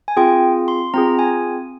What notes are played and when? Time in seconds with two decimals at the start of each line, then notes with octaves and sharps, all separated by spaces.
0.08 G#5
0.17 C4 F4 G#4 G5
0.68 C6
0.94 C4 F4 G#4 A#5
1.19 G#5